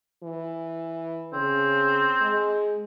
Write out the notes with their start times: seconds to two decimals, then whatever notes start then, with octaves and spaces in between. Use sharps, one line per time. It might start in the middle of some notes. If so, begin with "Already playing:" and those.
0.23 E3
1.33 C#3 C4
2.21 G#3